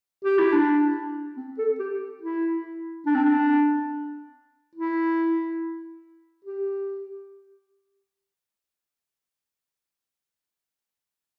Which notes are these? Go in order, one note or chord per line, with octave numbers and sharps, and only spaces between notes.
G4
E4
D4
C4
A4
G4
E4
D4
C4
D4
E4
G4